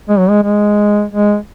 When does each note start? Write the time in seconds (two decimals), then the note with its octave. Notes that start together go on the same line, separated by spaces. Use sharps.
0.09 G#3
0.19 F#3
0.30 G#3
0.43 G#3
1.12 G#3